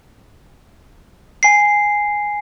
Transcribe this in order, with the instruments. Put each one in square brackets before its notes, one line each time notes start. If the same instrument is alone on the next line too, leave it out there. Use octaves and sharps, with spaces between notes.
[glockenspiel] G#5 C7